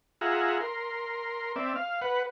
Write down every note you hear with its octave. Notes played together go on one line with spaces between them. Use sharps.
F4 G#4 E5 F#5 A#5
A#4 C6
C4 D5 E5
F5
B4 F#5